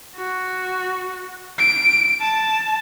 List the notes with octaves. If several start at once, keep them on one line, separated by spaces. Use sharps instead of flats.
F#4
D7
A5